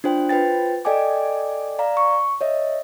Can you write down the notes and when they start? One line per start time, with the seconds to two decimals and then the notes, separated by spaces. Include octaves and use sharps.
0.04 D4 F4 C5 G5
0.29 F4 B4 C5 G5 A6
0.85 A4 D5 D#5 G5 G#5 D6
1.79 D5 F5 A#5
1.97 C#6
2.41 C#5 D#5 E5